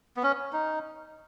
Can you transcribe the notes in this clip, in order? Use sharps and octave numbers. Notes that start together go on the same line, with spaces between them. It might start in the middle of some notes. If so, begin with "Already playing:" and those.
B3
C#4
D#4